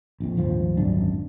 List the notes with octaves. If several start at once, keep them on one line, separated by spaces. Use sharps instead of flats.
A#1 F2
D#1 G#1 F3
D1 G#1 F#2 D4